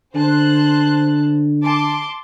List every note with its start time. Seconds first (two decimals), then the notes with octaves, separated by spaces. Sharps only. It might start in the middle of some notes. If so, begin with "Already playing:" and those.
0.15 D3 C5 A5 F#6
1.63 A5 C6 D6